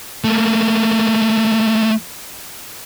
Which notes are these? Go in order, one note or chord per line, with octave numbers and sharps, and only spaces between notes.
A3 A#3